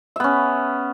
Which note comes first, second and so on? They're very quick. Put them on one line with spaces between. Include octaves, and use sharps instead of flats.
E5 B3 C#4